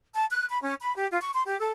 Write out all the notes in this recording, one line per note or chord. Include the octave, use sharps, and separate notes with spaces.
A5
F#6
B5
C#4
B5
G4
F4
C#6
C6
G4
A4